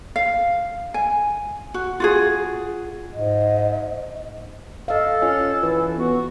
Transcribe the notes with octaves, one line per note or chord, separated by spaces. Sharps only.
F5
G#5
F#4
F4 F#4 G#4
G#2 D#5
A4 D#5 F5
C#4 F4
E3 B4
B3 F#4